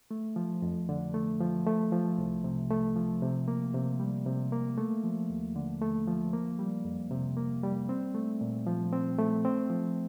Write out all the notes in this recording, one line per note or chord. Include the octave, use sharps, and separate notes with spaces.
A3
F3
F2
D3
A3
F3
A3
F3
C2
C3
A3
F3
C3
A#3
C3
G3
C3
A#3
A3
F3
D#2
D3
A3
F3
A#3
G3
F2
C3
A#3
G3
C4
A3
A#2
F3
C4
A3
C4
F3